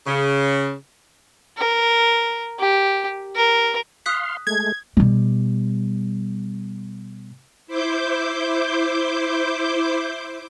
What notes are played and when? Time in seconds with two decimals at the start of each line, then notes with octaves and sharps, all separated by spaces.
0.07 C#3
1.58 A#4
2.59 G4
3.36 A#4
4.06 F5 C6 D#6 F#6 B6
4.47 G#3 A3 G#6
4.97 B2 G3
7.67 E4 C5 D6 G6